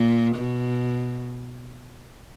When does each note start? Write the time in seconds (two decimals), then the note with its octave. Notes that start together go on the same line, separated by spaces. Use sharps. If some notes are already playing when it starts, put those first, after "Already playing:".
Already playing: A#2
0.35 B2